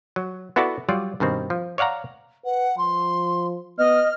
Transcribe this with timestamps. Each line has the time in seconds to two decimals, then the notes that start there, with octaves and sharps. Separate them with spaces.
0.16 F#3
0.56 B3 E4 F#4 A4 D5 A5
0.89 F#3 G3 F4 D5
1.20 G2 B2 D#3 C4
1.50 F3
1.78 C#5 D5 F5 F#5 A#5
2.45 B4 F#5
2.78 F3 C6
3.78 B3 D#5 F6